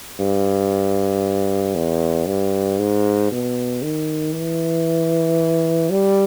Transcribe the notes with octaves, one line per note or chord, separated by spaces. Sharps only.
G2
E2
G2
G#2
B2
D#3
E3
G3